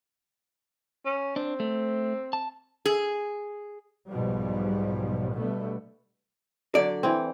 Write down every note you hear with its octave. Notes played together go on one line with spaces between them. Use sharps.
C#4
C4 D4
A3
A5
G#4
B1 G#2 B2 F3 G3
B2 D3 G3 A3 B3
D3 F#3 D5
E3 C4